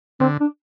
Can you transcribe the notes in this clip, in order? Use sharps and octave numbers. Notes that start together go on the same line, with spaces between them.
D3 C4
D4